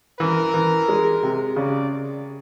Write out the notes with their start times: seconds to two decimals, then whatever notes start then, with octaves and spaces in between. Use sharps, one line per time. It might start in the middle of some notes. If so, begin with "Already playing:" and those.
0.20 E3 A#4
0.54 E3
0.88 G#3
1.23 C3
1.56 C#3 D5